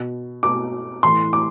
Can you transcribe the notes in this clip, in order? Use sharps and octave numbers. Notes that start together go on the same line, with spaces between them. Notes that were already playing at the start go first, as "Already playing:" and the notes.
Already playing: B2
B2 D6
A2 E3 C6
D6